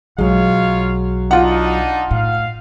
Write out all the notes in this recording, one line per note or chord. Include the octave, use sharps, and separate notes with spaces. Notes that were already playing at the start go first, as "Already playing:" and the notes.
B1 F#3 G#3 F4 C#5 F5
D4 D#4 F4 F#5
A2 F5